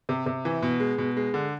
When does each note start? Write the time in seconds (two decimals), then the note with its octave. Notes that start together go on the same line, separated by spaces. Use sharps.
0.09 C3
0.26 C3
0.45 E3
0.62 B2
0.80 G#3
0.98 B2
1.17 G#3
1.34 D3